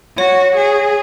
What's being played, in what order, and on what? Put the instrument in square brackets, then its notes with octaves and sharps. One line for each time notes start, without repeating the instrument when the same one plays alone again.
[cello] F#4 [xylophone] C#5
[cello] G#4